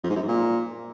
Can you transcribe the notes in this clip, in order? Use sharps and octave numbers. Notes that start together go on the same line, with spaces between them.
F2
G#2
F#2
G#2
A#2